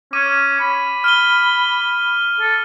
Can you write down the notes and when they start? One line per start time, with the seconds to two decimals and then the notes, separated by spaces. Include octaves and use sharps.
0.13 C#4 D6 D#7
0.60 B5
1.04 F6 D#7 G7
2.40 A4